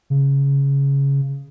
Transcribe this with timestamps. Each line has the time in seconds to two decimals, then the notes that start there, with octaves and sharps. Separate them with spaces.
0.10 C#3